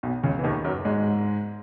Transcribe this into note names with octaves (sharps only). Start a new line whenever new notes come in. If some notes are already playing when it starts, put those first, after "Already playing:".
B1 B2
C#2 C#3
E3
D#2 D#3
F#2 F#3
G#2 G#3